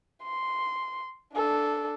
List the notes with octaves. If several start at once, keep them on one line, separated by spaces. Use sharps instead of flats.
C6
D4 A4